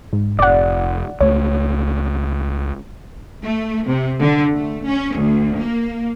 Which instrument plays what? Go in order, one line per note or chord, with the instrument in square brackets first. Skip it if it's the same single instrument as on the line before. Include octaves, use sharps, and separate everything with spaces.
[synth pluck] G#2
[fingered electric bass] F1 [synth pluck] D5 F#5
[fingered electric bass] C#2 A3 [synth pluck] C#5
[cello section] A3
C3
D3
A3
C#4
D2
A#3